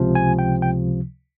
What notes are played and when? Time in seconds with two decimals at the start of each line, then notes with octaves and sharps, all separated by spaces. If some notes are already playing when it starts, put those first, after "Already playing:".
Already playing: C#2 C3 F3
0.15 G#5
0.39 G5
0.62 G5